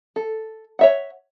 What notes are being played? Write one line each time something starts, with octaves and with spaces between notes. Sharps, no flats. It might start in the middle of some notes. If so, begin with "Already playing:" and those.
A4
C#5 E5 F#5